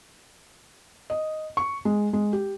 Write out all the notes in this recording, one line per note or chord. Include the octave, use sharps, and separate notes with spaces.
D#5
C#6
G#3
G#3
G4